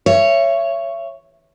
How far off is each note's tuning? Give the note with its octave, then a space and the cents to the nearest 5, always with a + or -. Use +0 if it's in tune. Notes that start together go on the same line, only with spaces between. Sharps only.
C#5 +0 E5 +35